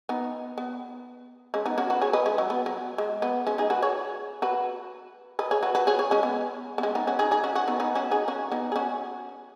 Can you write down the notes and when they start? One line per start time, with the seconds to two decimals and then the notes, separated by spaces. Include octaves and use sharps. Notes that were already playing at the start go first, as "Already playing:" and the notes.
0.09 B3 D#4
0.58 B3
1.54 G#3 C#4
1.66 B3 D#4
1.78 C#4 F#4
1.90 F#4 B4
2.02 G#4 C#5
2.13 B4 D#5
2.26 G#3 C#4
2.38 F#3
2.50 B3
2.66 F#3
2.98 G#3
3.22 B3
3.47 G#3 C#4
3.58 D#4 G#4
3.70 F#4 B4
3.82 G#4 C#5
4.42 F#4 B4
5.39 B4 D#5
5.51 G#4 C#5
5.63 F#4 B4
5.75 F#4 B4
5.87 G#4 C#5
5.99 G#4 C#5
6.11 G#3 C#4
6.23 B3
6.78 B3
6.83 G#3 C#4
6.95 B3 D#4
7.07 C#4 F#4
7.19 D#4 G#4
7.31 D#4 G#4
7.44 C#4 F#4
7.55 C#4 F#4
7.68 B3 D#4
7.80 B3 D#4
7.95 C#4 F#4
8.11 D#4 G#4
8.28 C#4 F#4
8.52 B3 D#4
8.72 G#4
8.76 C#4 F#4